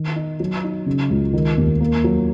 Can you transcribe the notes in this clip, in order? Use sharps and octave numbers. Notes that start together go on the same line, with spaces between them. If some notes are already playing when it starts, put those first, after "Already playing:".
Already playing: D#3
D#4
F#3
D#4
C#3
C#2
D#3
D#2
A#3
F#3